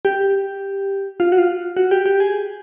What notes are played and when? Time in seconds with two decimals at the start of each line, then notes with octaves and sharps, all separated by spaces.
0.05 G4
1.20 F4
1.32 F#4
1.38 F4
1.77 F#4
1.91 G4
2.06 G4
2.20 G#4